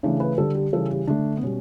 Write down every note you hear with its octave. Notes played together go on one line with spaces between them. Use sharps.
C#3 E3 A3 D4
B4
D3 G3 A4
G4
C#3 E3 G3 A4
G4
D3 A3 D4
B3
B2 G3 C#4